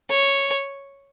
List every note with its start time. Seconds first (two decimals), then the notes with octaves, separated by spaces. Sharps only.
0.10 C#5